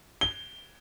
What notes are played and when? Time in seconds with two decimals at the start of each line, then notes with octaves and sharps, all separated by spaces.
0.21 G7